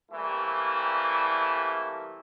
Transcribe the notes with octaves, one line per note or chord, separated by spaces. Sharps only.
C2 E3 G3 A3 A#3 E4